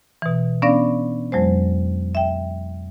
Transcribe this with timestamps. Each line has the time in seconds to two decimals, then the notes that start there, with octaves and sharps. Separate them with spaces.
0.22 B2 E3
0.62 B3 C#4 D4 D5 F5 A#6
1.32 F2 F#3 G#3 C5
2.15 E5 G5